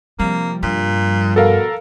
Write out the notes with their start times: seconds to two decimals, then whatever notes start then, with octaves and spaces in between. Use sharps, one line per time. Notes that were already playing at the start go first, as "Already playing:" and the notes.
0.19 C3 F3 G3 A#3 C4
0.63 G2 A#2
1.36 B2 A4 A#4 F5